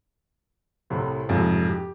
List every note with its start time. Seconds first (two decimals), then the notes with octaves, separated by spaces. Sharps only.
0.90 C2 A2 C3 C5
1.29 A1 F2 G#2 C3
1.69 G4